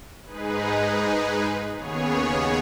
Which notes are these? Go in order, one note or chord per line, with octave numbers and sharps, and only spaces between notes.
G#2 G#3 D#4 G#4 B4
D#2 C#3 B3 G#4 C#5